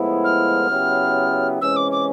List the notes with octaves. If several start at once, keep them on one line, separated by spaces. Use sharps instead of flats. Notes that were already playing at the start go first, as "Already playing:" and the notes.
Already playing: A2 F3 G#3 B3 E4
F6
C#3 F#3 B3 E4 G4
C3 E3 G#3 C#4 E6
D6
D6